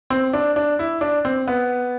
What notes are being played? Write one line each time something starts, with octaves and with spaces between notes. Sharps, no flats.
C4
D4
D4
E4
D4
C4
B3